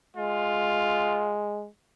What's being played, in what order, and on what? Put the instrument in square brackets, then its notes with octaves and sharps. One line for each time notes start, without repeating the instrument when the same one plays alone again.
[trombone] G#3 [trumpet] F4